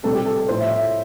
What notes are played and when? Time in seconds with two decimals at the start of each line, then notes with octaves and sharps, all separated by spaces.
0.03 C3 G3 C4 A4
0.15 G4
0.26 A4
0.38 A4
0.48 A2 F3 A3 C5
0.60 E5
0.71 E5